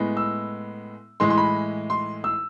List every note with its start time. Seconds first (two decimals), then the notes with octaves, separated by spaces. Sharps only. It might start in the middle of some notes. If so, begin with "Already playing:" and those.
Already playing: A2 G#3 B3
0.17 E6
1.20 A2 E3 G#3 C6
1.30 C6
1.38 B5
1.90 C6
2.24 E6